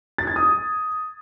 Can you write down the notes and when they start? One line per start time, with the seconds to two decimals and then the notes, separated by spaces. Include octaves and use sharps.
0.18 A6
0.27 G#6
0.36 D#6